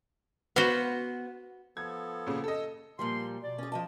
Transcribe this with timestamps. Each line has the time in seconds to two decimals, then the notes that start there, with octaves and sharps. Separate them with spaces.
0.56 B3 F#4 C5 F5
1.77 F3 B3 A4 G#6
2.27 A#2 C#3
2.44 A4 D#5 E6
2.99 A#2 F3 G3 C6
3.42 B2 D5
3.58 C#4 G#4
3.72 F3 D#5 A5